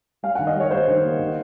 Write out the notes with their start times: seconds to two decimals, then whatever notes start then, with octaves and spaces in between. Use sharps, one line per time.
0.23 G3 F5
0.35 D#3 F#5
0.47 D#5
0.55 G3 C#5
0.71 G3 C5
0.88 D#3
1.03 A#3
1.19 D#3